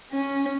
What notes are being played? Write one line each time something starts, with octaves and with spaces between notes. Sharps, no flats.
C#4